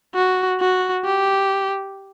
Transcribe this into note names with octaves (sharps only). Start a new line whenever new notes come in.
F#4
F#4
G4